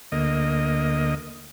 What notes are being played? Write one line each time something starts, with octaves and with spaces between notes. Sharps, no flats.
D2 A#3 D#5